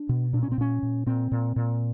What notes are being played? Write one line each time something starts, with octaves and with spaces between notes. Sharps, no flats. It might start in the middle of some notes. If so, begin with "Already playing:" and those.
Already playing: D4
B2
A#2 D4
C#4
C4
A#2 C#4
A#2
A#2 C4
A#2
A#2